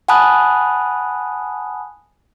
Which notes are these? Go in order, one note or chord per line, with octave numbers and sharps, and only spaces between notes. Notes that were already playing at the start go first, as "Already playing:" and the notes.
F#5 G#5 A5 B5 D#6 F#6